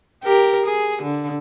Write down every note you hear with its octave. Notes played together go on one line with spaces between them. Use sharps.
G4 A#4
G#4
D3